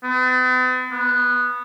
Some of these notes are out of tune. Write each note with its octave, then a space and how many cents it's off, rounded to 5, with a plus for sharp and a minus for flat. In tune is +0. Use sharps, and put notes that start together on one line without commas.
B3 +45
B3 -5